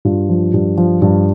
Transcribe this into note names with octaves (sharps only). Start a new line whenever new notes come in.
G2 F4
F3
G2
F3
G2